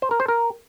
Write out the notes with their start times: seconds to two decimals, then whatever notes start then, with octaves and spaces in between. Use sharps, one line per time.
0.02 C5
0.11 A#4
0.20 C5
0.28 A#4